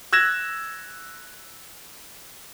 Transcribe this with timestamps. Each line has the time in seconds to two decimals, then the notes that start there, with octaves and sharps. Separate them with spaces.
0.13 E6 F#6 G#6 A#6 E7